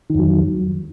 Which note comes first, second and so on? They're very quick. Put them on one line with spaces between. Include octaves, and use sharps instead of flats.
D#3 F2 F#3